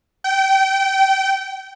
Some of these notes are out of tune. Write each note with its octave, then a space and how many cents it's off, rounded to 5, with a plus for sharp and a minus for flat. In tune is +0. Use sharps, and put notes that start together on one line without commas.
G5 -25